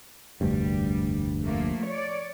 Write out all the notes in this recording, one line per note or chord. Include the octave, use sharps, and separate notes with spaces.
F1 D2 G2 G3
F3 A3 A#3
C#5 D5